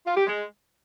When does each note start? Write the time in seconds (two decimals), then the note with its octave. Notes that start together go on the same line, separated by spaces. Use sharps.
0.07 F4
0.17 G4
0.27 G#3